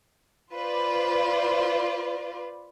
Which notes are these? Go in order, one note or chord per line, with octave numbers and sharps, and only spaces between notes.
F4 B4 C5 D5